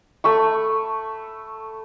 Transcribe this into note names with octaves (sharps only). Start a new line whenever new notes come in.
A3 B5 C#6